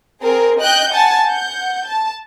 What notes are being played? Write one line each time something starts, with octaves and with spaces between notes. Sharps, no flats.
C4 G#4 A#4
D#5 G5 F#6 G6
F#5 G#5 A5
F#5 G6
A5